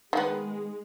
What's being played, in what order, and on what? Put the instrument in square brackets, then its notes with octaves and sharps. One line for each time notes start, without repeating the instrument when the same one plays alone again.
[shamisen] D#3 B3 [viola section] G#3